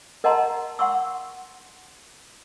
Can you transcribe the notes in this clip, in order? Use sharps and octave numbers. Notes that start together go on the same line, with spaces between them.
A#4 D#5 F#5 A5 A#5 C6
F#5 C6 C#6 E6